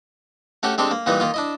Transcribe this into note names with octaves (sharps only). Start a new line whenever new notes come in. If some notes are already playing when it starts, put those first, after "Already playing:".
A3 C#4 F#4 G4 A4
G#3 C4 D4 G4 A4
A#3
A#2 E3 G3 A#3 D#4
D#3 A#3 F4
D4 E4 D#5